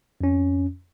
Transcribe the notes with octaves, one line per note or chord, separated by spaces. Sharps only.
F2 C#4